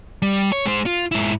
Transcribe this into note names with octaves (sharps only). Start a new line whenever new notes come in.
G3
C#5
G#3 C5
F4
G#2 E4